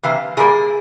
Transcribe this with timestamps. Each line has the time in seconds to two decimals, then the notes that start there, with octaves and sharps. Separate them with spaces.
0.03 C3 E3 A#3 F5
0.37 A#2 G3 A#3 G#4